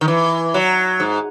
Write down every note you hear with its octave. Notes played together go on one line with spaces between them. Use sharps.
D#3
E3
F#3
G#2